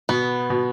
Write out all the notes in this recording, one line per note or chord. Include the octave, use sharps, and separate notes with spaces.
B2 B3
B2